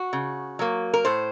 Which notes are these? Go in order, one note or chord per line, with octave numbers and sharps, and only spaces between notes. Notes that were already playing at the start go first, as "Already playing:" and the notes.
Already playing: F#4
C#3
F#3 A#3
A#4
A2 C5